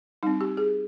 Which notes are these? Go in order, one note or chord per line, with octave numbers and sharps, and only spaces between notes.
G3 C4 D#4
G4
G#4